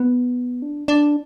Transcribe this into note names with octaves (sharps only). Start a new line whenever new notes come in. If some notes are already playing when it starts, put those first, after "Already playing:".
Already playing: B3
D4
D4